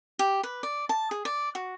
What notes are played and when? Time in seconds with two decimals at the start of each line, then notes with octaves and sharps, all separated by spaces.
0.19 G4
0.43 B4
0.63 D5
0.89 A5
1.11 G#4
1.25 D5
1.55 F#4